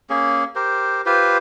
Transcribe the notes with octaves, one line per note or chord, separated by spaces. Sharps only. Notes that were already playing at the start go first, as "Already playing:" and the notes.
A#3 C#4 G#4
G4 A#4 C5
F4 G4 B4 C5